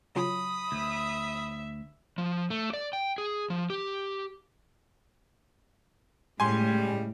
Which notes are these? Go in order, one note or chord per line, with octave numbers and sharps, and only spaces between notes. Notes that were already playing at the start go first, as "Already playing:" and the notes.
C#3 F#3 F4 B5 D#6
D2 E5
F3
A3
D5
G5
G#4
F3
G4
A2 C#3 G3 G#3 G#5 C6